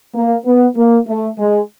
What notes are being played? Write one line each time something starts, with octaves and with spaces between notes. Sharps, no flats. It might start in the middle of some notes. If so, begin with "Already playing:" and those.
A#3
B3
A#3
A3
G#3